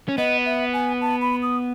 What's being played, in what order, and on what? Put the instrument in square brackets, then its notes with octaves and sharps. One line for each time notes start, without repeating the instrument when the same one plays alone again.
[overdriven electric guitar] C#4
[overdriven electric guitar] B3 [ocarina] D#5
[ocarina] E5
G#5
A5
B5
D#6